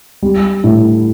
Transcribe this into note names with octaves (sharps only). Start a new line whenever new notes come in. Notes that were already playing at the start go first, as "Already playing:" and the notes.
G3
A2